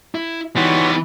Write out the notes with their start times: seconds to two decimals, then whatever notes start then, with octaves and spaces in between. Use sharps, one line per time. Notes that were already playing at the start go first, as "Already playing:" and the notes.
0.15 E4
0.56 E3 G3 B3 D#4 F#4 C#5 C6